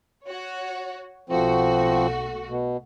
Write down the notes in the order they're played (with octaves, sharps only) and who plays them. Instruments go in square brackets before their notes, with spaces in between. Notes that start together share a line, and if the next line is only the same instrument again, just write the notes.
[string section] F#4 C#5
[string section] B1 A3 F#4 [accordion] F3 C4
[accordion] B2